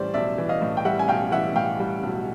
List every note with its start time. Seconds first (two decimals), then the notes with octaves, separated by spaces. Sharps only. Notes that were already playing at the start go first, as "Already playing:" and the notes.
Already playing: A2 E3 G3 C5 D5
0.14 B1 D5 E5
0.38 E3
0.49 D#5 F5
0.62 A2
0.77 G5
0.85 G3 E5 F#5
0.99 G#5
1.08 B1 F5 G5
1.31 E3 E5 F#5
1.56 A2 F5 G5
1.79 G3
2.03 B1